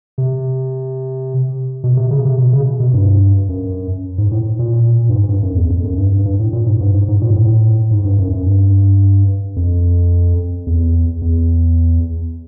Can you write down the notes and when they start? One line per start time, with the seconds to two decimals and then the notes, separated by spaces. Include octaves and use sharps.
0.18 C3
1.84 B2
1.97 C3
2.11 C#3
2.25 C3
2.38 B2
2.53 C#3
2.80 B2
2.94 G2
3.49 F#2
4.18 G#2
4.31 A2
4.59 A#2
5.09 G2
5.15 G#2
5.29 G2
5.42 F#2
5.56 E2
5.70 F2
5.84 F#2
5.98 G2
6.12 G2
6.25 G2
6.39 A2
6.53 A#2
6.66 G#2
6.80 G2
6.94 G#2
7.08 G#2
7.22 A#2
7.30 G#2
7.36 A2
7.91 G#2
8.05 G2
8.18 F#2
8.32 F#2
8.46 G2
9.56 F2
10.67 E2
11.22 E2